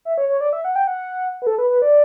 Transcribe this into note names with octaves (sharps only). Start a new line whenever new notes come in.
E5
C#5
C#5
D5
E5
F#5
G5
F#5
B4
A4
B4
B4
D5